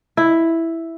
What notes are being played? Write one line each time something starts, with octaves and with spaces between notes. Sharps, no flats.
E4